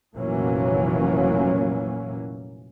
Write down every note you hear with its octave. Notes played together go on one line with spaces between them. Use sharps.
F1 A#2 E3 F#3 A#3 C#4